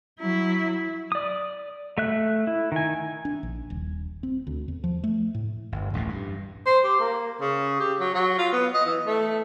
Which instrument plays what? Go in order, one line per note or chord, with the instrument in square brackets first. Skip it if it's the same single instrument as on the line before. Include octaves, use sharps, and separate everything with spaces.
[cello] F#3 E4
[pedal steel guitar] D5 D#6
A3 E5 F#6
E4
D#3 G#5
[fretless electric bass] D4
A#1
D#1
C4
D2
E2
F3
A3
A2
[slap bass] G1
D1 A1 F2 A#2
G2
[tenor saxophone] C5
G4
A#3
C#3
G4
F#3
F#3
F4
B3
D#5
E3
A3